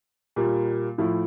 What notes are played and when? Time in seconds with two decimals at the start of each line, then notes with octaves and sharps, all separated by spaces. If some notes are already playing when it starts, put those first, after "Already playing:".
0.36 A#2 G3 A#3
0.98 A2 F3 A3 E4